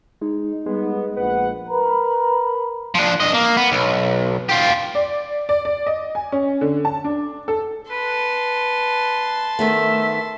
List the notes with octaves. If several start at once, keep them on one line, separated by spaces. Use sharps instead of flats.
G#3 D#4
G3 G#3 B3
A#1 B4 F#5
A#4 B4 A#5 B5
F3 D4
G2 D#5
A#3
B3
B1
F4 G4
D5
D5
D5
D#5
G#5
C#4
D3
A5
D4
A4
B4 A5 C6
D#3 A3 B3 E5